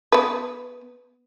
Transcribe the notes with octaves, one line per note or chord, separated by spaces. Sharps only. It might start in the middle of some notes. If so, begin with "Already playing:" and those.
B3 B4